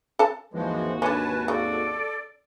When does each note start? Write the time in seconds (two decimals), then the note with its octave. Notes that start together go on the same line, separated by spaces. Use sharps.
0.19 A4 A5
0.54 G#1 D#2 E3 F3 G#3 F#4
1.02 D3 C#4 B4 G#5 A5 F#6
1.48 C#3 A4 D5